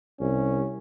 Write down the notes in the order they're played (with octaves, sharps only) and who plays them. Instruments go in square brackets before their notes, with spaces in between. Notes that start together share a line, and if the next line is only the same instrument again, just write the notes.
[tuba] C2 [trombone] C#4